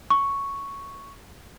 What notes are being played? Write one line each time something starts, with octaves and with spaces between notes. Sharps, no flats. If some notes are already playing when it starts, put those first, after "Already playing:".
C#6